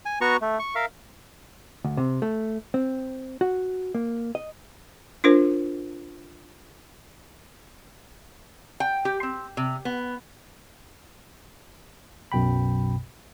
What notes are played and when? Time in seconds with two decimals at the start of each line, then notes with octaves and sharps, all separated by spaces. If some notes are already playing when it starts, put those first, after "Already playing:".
0.05 G#5
0.21 B3 F#4 A#5 C#6
0.41 A3
0.59 C#6
0.75 A#4 E5 F5
1.84 D2
1.97 C3
2.22 A3
2.74 C4
3.41 F#4
3.95 A#3
4.35 D#5
5.24 D4 F4 A#4 C5
8.80 G5
9.05 G4
9.23 C4
9.57 C3
9.85 B3
12.32 B1 F#2 B2 G5 B5